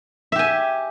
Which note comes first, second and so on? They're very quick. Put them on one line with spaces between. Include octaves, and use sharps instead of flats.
E5 G4 G#5